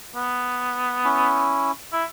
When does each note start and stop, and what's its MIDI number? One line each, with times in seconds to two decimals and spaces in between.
0.15 1.52 59
1.05 1.72 61
1.05 1.72 64
1.93 2.04 64